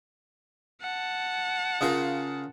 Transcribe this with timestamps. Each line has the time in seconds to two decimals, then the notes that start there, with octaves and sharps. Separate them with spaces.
0.82 F#5 A5
1.81 C#3 F4 A#4